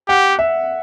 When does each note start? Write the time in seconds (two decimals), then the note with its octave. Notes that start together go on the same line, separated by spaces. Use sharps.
0.09 G4 F#5
0.39 E5